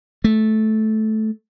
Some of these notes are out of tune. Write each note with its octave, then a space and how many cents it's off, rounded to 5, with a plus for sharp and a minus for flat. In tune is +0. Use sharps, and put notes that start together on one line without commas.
A3 -15